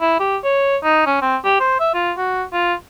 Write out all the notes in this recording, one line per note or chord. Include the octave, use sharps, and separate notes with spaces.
E4
G4
C#5
D#4
C#4
C4
G4
C5
E5
F4
F#4
F4